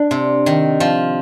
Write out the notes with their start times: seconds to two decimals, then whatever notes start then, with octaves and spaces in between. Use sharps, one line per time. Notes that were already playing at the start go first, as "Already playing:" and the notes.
Already playing: D4
0.11 C3
0.46 D#3
0.80 F3